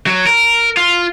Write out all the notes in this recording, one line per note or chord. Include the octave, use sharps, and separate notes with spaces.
F#3
A#4
F4